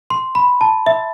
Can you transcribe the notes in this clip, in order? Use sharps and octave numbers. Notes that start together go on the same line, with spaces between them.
C6
B5
A5
E5